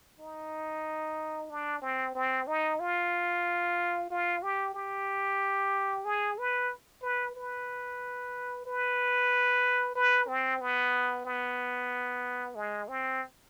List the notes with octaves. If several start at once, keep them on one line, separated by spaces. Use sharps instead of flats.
D#4
D4
C4
C4
D#4
F4
F4
G4
G4
G#4
B4
B4
B4
B4
B4
C4
B3
B3
G#3
C4